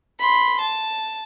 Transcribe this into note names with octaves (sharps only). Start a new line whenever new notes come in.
B5 C6
A5